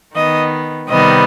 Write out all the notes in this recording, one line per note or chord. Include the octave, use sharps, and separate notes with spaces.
D#3 B3 D#5
C3 D#3 G3 B3 D#5